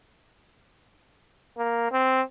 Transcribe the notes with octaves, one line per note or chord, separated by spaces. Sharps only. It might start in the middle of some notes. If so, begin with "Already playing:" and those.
A#3
C4